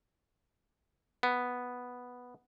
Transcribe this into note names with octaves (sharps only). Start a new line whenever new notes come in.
B3